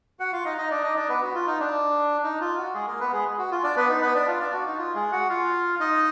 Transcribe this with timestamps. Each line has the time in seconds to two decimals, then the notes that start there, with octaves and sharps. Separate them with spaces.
0.20 F#4 F#5
0.32 F4 F5
0.45 D#4 D#5
0.58 D#4 D#5
0.71 D4 D5
0.83 D#4 D#5
0.96 D4 D5
1.09 B3 B4
1.22 F#4
1.35 F4
1.47 D#4
1.60 D4
2.23 D#4
2.41 F4
2.57 F#4
2.74 G#3 G#4
2.87 A#3 A#4
3.00 B3 B4
3.13 G#3 G#4
3.38 F#4
3.51 F4
3.64 D4 D5
3.77 B3 B4
3.89 D#4
4.02 B3 B4
4.15 D4 D5
4.28 F4 F5
4.40 D4 D5
4.53 F#4
4.66 D#4
4.78 F4
4.95 G#3 G#4
5.12 F#4 F#5
5.29 F4 F5
5.80 D#4 D#5